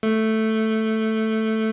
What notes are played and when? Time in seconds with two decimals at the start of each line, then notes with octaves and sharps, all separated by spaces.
0.03 A3